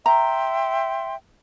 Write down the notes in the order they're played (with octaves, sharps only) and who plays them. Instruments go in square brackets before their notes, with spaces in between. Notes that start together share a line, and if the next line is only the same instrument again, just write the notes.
[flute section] E5 G5 C6 [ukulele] A#5